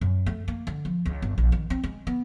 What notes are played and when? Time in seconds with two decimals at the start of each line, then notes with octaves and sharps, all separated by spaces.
0.01 F#2
0.26 A3
0.48 A#3
0.67 D3
0.85 F3
1.05 C#2
1.22 G1
1.38 A#1
1.52 D#3
1.70 C4
1.84 G#3
2.07 B3